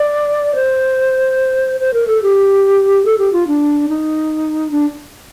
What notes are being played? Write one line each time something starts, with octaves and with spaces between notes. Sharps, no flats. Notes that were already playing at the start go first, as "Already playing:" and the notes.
Already playing: D5
C5
C5
A#4
A4
G4
A4
G4
F4
D4
D#4
D4